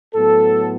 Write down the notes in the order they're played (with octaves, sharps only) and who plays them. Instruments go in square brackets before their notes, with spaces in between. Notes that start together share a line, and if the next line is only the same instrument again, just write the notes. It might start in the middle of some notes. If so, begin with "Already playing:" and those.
[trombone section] A2 F#3 B3 A4